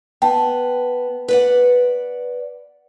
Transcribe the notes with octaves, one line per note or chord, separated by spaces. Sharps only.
B3 G5 A5
B4 D5 F#5